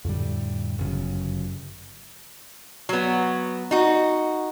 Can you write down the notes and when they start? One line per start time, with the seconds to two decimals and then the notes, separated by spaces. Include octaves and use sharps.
0.05 F2 A2 D3 G3
0.79 G1 F#2 C#3 F#3
2.89 F#3 B3
3.71 D#4 F#4